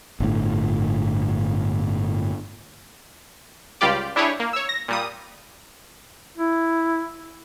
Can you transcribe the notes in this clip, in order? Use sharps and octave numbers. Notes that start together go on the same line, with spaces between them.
G1 A2
C#2 G3 F4 G4 D5
D4 E4 G4 G#4 C#5
A#3
C#5 E6
A#6
A#2 G3 D#6
E4